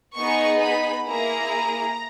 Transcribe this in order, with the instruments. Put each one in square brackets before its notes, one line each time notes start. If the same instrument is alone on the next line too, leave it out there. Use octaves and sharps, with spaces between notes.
[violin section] B3 D#4 G#4 C#6
B5
A#3 E4 G#4 A#5